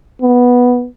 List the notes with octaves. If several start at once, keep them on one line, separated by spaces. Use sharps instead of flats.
B3